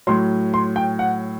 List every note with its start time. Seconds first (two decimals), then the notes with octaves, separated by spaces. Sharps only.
0.07 A2 F#3 C6
0.54 C6
0.76 G5
0.99 F#5